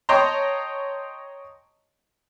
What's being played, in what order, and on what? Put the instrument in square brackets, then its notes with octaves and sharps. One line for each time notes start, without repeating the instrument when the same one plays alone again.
[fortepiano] C#5 D#5 G5 A5 A#5 C6